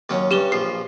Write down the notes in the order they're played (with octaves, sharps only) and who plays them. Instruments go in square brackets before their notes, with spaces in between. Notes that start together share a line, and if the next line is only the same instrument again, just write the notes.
[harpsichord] D#2 F#3 C#4
[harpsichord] G2 C#4 [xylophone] G4 E7 G7
[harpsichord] A#1 F3 [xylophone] C7